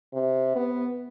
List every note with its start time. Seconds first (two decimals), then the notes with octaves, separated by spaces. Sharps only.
0.13 C3
0.56 B3